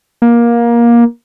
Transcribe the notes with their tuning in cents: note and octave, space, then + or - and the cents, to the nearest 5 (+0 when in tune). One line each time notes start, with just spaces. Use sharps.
A#3 +20